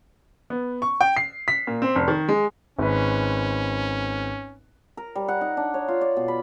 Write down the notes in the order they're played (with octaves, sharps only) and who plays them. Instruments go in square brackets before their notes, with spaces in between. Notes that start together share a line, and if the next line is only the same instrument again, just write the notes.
[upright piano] B3
C#6
G5
C7
B6
A#2
C4
F1
D#3
G#3
[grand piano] G#1 B4 [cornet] C#4
[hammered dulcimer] A#4
G3
F#5
D#4
D4
C#5
F4
D5
B2
B5